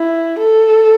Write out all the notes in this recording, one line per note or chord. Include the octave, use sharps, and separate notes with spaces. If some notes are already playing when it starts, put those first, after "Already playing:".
Already playing: E4
A4